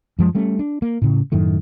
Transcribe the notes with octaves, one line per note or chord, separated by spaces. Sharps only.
F#2 F3 G#3
G3 A3 C#4
D4
A#3
A2 C#3
F#2 A2 D#3 A3